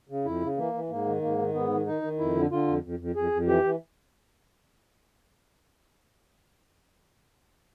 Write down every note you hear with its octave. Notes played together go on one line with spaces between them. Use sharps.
C#3
F2 E4
C#3
E3 A#3
E3
G#2 A#3
D#3
G#2 A#3
D#3
G#2 B3
D#3
D#3 D#4
D#3
F2 E4
D3
D3 F4
F2
F2
F2
F2 G#4
F2
E3 G4
E3